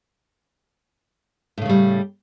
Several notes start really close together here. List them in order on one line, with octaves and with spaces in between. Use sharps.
A2 C#3 A3 G3